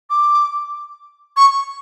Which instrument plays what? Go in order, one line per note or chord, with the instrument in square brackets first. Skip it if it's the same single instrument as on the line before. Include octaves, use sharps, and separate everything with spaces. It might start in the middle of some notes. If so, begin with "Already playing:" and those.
[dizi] D6
C#6